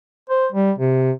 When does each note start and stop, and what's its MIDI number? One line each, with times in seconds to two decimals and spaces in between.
0.30 0.47 72
0.52 0.72 55
0.78 1.12 48